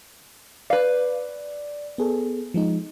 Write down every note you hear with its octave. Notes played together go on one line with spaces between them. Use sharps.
B4 D5 F5
B3 G#4 A4
F3 G#3 D#4